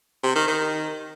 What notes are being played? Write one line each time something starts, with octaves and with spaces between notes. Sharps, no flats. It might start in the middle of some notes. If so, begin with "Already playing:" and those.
C3
D#3
D#3